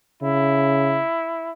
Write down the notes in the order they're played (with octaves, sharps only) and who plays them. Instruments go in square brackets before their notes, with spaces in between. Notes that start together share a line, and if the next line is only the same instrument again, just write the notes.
[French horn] C#3 [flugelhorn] E4